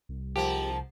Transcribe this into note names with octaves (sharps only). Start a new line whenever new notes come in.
C2
G#2 F3 A#3 G4 A5